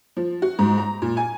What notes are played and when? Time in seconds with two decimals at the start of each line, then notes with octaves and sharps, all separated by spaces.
0.17 F3
0.42 F#4
0.59 G#2
0.78 A#5
1.02 A#2
1.17 G#5